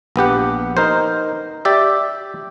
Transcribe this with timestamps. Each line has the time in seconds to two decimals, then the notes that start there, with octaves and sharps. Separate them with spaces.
0.16 A#1 B3 G4 F#5
0.77 D#4 A#4 C5
1.65 G4 D5 E5